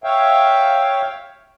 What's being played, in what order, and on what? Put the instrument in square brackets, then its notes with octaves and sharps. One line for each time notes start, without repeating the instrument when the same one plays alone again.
[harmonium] C#5 E5 F5 G5